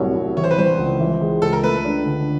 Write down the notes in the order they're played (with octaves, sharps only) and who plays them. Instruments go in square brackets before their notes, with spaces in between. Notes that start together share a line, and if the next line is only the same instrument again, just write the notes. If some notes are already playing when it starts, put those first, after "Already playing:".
Already playing: [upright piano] C2 A2 F#3 [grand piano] C#5
[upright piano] C2
[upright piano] E3 [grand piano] C#5
[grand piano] C5
B4
[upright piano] G3 [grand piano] C5
[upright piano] C#2
E3
G#3
[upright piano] C#2 [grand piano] A4
[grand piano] A#4
[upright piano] A3 [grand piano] B4
[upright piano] D4
D3